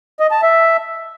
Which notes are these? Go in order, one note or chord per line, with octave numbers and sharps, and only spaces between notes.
D#5
A5
E5